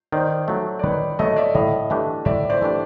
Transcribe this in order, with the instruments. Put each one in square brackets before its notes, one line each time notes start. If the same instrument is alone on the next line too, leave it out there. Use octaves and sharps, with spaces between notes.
[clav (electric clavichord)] D#3 [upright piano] C5 D5
[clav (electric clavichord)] F#3 A3
[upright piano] D5
[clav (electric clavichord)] D#3 [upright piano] B4 C#5
[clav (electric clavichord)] F#3 A3 [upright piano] C#5 D#5
[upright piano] D5 E5
[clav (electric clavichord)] A2 [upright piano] D#5 F5
[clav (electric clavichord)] E3 A3 D4 G4
[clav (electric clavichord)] A2 [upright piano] D5 E5
[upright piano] C5 D5
[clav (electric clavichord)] E3 A3 D4 G4